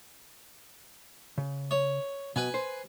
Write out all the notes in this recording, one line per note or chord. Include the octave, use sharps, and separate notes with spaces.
C#3
C#5
B2 B4 G#5
C5